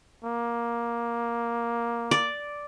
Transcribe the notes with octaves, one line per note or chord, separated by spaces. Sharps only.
A#3
D5